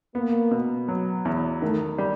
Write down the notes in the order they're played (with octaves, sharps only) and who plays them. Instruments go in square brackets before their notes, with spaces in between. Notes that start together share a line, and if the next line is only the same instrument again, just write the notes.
[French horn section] A#3 [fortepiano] B3
[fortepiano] B2
F#3
E2
[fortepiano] D#3 [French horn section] A3
[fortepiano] G3